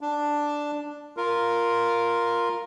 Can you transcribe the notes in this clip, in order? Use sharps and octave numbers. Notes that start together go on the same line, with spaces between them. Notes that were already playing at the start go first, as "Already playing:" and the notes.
D4
F4 A#4